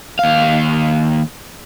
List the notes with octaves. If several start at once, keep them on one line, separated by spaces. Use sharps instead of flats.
D#2 F5